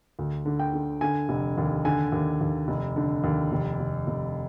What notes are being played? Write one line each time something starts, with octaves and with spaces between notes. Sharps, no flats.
D2
D3
G5
D3
D3 G#5
F1
D#2
D3 G#5
D#2
D#2
F1
D3
D#2
F1
F1
F1